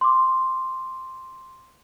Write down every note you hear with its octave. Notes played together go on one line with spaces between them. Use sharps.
C6 D6